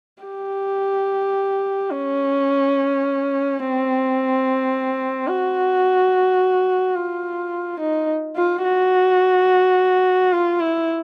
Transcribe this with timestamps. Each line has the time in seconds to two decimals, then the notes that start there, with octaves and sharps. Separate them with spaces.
0.23 G4
1.91 C#4
3.59 C4
5.27 F#4
6.96 F4
7.80 D#4
8.36 F4
8.64 F#4
10.32 F4
10.60 E4